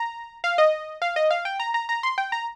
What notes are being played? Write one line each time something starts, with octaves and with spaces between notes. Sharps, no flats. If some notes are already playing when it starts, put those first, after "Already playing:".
Already playing: A#5
F5
D#5
F5
D#5
F5
G5
A#5
A#5
A#5
C6
G5
A#5